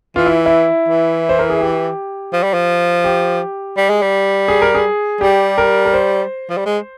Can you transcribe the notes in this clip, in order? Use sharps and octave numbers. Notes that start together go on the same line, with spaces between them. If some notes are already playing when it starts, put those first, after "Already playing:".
E3 F4
E4
E4
E3
C5
A#4
G#4
G4
F3
G3
F3
G4
G3
G#3
G3
G#4
A#4
G#4
G3 G4
A#4
A#4
C5
F3
G3
G#3